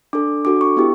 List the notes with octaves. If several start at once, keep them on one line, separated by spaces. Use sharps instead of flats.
D4 A4 D6
D4 F#4 A4 D6
C#6
B3 E4 G4